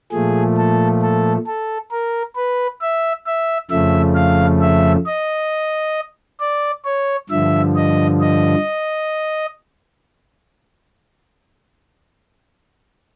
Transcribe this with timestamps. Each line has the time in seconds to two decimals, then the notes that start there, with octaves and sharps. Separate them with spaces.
0.11 A#2 F3 A3 G#4
0.57 A4
1.02 A4
1.46 A4
1.91 A#4
2.36 B4
2.81 E5
3.26 E5
3.70 F2 C#3 F3 A3 E5
4.15 F5
4.61 E5
5.06 D#5
6.40 D5
6.85 C#5
7.30 G2 D3 F3 E5
7.75 D#5
8.20 D#5